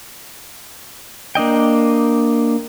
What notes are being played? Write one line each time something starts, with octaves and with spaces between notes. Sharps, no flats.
A#3 D4 D#5 G5